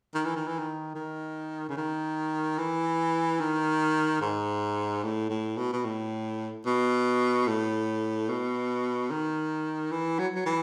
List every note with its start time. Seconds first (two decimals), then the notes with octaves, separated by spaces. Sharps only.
0.14 D#3
0.26 E3
0.36 D#3
0.47 E3
0.59 D#3
0.95 D#3
1.69 C#3
1.77 D#3
2.59 E3
3.40 D#3
4.21 G#2
5.03 A2
5.30 A2
5.57 B2
5.73 B2
5.85 A2
6.66 B2
7.47 A2
8.29 B2
9.10 D#3
9.92 E3
10.19 F#3
10.35 F#3
10.46 E3